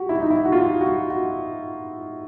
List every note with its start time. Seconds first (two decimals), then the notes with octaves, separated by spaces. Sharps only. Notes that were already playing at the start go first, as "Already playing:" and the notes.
Already playing: F#4 G4
0.09 E4
0.20 D#4
0.30 E4
0.45 F#4
0.52 F4
0.81 F#4
1.10 F#4